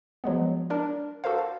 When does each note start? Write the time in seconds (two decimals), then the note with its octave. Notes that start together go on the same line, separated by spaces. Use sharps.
0.24 F3 F#3 G#3 B3
0.70 D4 A#4 D5
1.24 F#4 A4 A#4 C5 F5
1.38 A5